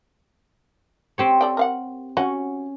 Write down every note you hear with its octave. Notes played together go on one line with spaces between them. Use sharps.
C4 G4 C#5
A4 D5 G5
A#4 F5 F#5
C#4 F#4 F#5